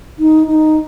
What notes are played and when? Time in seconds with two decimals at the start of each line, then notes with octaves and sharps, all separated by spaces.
0.19 D#4
0.47 D#4